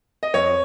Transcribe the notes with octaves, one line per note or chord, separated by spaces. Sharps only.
D#5
F2 C#5